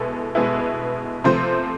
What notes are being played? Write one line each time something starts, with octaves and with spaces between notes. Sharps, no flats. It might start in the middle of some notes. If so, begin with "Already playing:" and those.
Already playing: B2 G#3 B3 E4 A4
B2 G#3 B3 E4
C3 F3 A3 C4 C5